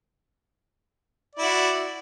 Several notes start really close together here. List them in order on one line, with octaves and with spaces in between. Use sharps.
D5 E4 F#4